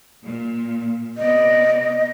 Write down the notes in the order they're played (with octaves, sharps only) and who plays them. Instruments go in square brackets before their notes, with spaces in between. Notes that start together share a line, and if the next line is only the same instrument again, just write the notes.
[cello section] A#2
[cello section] C3 B3 D5 [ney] D#5